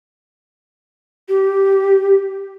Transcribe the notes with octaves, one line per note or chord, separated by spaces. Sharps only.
G4